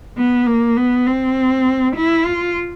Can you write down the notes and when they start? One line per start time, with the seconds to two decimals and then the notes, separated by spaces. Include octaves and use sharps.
0.17 B3
0.46 A#3
0.77 B3
1.07 C4
1.96 E4
2.26 F4